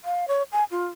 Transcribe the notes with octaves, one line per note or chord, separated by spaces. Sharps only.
F5
C#5
G#5
F4